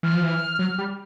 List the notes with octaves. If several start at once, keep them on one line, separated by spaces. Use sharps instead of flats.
E3 F6
F3
E3
F#3
G3